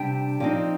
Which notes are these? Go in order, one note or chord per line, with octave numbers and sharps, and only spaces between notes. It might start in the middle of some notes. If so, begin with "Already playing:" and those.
Already playing: C3 G3 D4 G5
F3 C4 D#4 D5